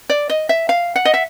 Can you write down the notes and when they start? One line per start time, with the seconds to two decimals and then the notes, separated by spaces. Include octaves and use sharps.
0.10 D5
0.30 D#5
0.49 E5
0.69 F5
0.96 F#5
1.05 D#5
1.14 E5